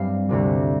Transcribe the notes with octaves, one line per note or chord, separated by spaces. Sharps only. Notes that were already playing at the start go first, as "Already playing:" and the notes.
Already playing: G2 G3 C4 G4 F5
D2 C3 G3